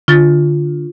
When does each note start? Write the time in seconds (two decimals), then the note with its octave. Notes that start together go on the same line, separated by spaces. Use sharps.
0.08 D3 F4 A6